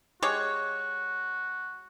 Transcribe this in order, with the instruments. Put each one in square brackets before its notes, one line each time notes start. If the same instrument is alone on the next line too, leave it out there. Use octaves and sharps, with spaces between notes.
[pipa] G#3 G4 C#5 [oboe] F#4